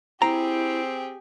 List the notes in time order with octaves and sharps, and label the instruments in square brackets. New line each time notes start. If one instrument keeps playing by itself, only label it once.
[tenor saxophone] C4 [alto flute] E4 [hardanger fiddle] G4 G#4 [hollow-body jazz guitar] A#5